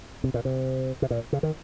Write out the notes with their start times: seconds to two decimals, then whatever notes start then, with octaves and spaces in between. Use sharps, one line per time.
0.24 C3
0.34 A#2
0.45 C3
1.02 C3
1.10 A#2
1.33 C#3
1.43 D#3